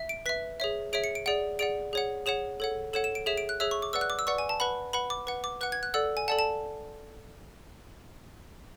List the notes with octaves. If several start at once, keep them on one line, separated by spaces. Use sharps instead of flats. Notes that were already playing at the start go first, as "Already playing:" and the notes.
Already playing: E5
D7
B4 E5 B6
G#4 C#5 E5
G#4 C#5 E5 D7
C#7
D7
G#4 D5 F#5 D7
G#4 D5 F#5 D7
G#4 C#5 F#5
G#4 C#5 F#5 E7
A4 C#5 F#5
A4 C#5 F#5 E7
E7
D7
G#4 C#5 E5 E7
D7
F#6
G#4 C#5 E5 E6
C#6
D6
B4 D5 F#5 E6
F#6
D6
E6
B4 D5 F#5 C#6
G#5
A5
B4 F#5 B5
B4 F#5 B5
D6
B4 F#5
D6
B4 F#5 F#6
G#6
F#6
A4 D5 F#5 E6
G#5
A4 D5 F#5 A5
A5